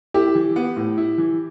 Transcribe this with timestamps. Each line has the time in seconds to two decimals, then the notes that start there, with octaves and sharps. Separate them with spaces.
0.14 E4 G4
0.35 E3
0.56 B3
0.77 A2
0.98 E4
1.18 E3